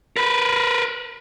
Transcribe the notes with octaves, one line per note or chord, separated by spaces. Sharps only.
A#4 B4